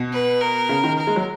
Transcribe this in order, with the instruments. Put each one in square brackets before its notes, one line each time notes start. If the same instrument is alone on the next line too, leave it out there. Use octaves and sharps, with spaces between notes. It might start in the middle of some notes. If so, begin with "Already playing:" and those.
Already playing: [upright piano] B2
[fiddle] B4
A#4
[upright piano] C#3
D#3
[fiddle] A#4
[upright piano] G#3
F#3